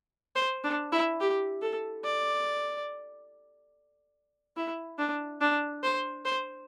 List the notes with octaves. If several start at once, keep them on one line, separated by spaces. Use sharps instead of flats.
C5
D4
E4
G4
A4
D5
E4
D4
D4
C5
C5